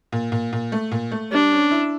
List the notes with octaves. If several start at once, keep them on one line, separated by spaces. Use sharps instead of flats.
A#2
A#2
A#2
A3
A#2
A3
G3 D4
C#4
E4